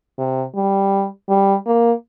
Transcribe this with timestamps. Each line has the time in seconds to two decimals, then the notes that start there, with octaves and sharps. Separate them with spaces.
0.18 C3
0.55 G3
1.29 G3
1.66 A#3